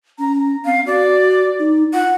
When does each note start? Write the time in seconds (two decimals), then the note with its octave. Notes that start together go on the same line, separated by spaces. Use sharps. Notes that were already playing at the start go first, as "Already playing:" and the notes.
0.19 C#4 A#5
0.65 C4 F5
0.86 F#4 D5
1.59 D#4
1.93 F4 F#5